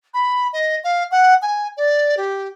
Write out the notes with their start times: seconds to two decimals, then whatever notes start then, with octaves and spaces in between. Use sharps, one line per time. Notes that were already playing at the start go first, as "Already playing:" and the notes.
0.14 B5
0.53 D#5
0.84 F5
1.11 F#5
1.42 G#5
1.77 D5
2.17 G4